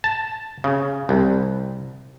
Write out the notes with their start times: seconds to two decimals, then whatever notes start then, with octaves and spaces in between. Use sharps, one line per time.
0.04 A5
0.64 C#3
1.09 C2